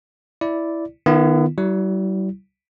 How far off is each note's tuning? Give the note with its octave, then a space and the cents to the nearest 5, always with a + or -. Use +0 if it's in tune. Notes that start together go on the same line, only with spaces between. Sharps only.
E4 +0 D5 -5
D#3 -20 B3 -5 E4 +40
G3 -45 E4 +0